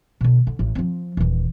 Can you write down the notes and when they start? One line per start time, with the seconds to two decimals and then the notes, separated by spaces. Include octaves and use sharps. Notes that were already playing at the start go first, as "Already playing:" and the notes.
0.21 B2 D3
0.47 D3
0.59 A1
0.75 F3 C4
1.17 D#1 E3